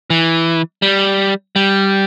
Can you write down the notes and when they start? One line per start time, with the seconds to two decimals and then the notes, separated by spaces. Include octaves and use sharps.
0.10 E3
0.82 G3
1.56 G3